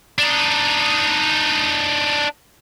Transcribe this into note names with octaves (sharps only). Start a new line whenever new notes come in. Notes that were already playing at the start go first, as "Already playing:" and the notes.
D4 D#4